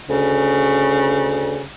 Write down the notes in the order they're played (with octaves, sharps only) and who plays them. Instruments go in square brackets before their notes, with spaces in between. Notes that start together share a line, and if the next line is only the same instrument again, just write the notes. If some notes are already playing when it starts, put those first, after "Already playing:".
[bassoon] D2 [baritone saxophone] C#3